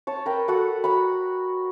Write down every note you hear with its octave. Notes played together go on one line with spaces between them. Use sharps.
C#5 A5
A#4 B4 G5
F#4 A4 F#5
A#5 B5